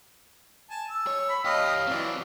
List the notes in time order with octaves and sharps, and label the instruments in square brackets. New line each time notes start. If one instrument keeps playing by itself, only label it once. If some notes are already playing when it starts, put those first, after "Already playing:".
[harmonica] G#5 A5
E6
[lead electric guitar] C#5
[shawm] B5
[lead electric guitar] G4 C#5 [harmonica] D#5 G5 [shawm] F5
[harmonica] E3 F#3 F4 [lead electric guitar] C4 D5